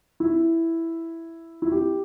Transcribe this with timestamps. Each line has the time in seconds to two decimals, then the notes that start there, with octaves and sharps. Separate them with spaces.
0.20 E4
1.62 E4
1.72 G4